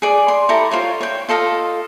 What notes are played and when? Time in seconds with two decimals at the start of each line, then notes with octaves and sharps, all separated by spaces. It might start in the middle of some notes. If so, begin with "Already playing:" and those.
0.02 G#4 D5
0.28 C6
0.49 E4 G4 A4 A#5
0.71 F4 C5 C#5
1.01 C#5 G5
1.29 F4 A4 D#5 F5